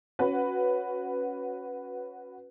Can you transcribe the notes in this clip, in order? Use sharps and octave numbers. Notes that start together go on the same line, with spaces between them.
C#4 F#4 B4